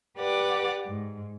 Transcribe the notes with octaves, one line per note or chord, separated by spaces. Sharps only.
G4 B4 D5 F#5 D6
G#2